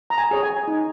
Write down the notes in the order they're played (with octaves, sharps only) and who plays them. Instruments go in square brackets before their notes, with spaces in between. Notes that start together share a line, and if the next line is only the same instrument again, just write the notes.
[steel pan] A#5
G#5
G#4 C#5
G#5
D#4